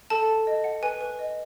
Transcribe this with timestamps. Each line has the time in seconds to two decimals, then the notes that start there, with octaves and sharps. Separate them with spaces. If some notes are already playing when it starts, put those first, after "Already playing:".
0.10 A4 A5
0.29 A4
0.47 D#5
0.64 F#5
0.82 B4 G#5
1.01 B4
1.19 D#5